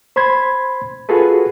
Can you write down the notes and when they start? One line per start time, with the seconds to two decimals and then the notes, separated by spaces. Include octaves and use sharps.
0.16 C5 B5 C6 G#6
1.09 F4 F#4 G#4 A4 B4